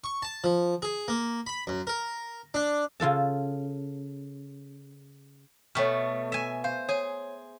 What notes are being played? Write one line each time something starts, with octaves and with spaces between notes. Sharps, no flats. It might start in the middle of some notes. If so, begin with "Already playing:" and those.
C#6
A5
F3
G#4
A#3
B5
F#2
A#4
D4
C#3 F4 A4 A5
B2 A3 C#5 G5 F6
E5 G#5
C5 F5
G#4 C#5 G#5